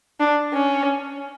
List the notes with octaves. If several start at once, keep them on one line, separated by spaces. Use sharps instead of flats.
D4
C#4